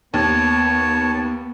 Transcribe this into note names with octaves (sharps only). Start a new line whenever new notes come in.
D#2 B3 C#5 A5